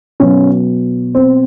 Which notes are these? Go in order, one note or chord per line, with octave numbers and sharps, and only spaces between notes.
B2 F#3 C#4
C4